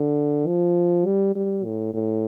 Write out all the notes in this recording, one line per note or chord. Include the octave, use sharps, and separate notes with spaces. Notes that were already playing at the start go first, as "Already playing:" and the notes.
Already playing: D3
F3
G3
G3
A2
A2